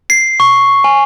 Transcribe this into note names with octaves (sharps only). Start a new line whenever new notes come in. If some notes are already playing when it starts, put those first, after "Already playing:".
C7
C#6
G#5